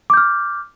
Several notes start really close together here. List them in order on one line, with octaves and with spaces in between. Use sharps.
D6 G6 F6